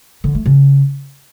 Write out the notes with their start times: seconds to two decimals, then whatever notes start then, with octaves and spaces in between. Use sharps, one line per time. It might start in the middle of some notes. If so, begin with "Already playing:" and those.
0.24 D3
0.35 A3
0.46 C#3